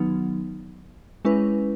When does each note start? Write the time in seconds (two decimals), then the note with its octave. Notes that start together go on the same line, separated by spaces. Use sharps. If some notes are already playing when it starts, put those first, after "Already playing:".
Already playing: D#3 F#3 B3 D#4
1.25 G#3 C#4 E4 B4